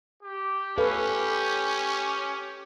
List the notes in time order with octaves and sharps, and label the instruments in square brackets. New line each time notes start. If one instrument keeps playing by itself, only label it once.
[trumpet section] G4
[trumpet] C#4 [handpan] A4 B4 F5